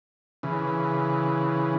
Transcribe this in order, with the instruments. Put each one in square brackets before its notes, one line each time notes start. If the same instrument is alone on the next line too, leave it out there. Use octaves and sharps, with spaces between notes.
[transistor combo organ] C#3 E3